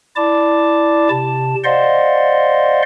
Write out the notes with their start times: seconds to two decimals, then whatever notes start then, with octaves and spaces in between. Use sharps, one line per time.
0.16 E4 D5 A5 D6
1.10 C3 A5
1.64 C5 D5 D#5 F5 F#5 C6